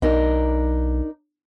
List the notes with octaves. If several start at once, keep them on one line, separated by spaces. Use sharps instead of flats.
B1 D4 D#4 A#4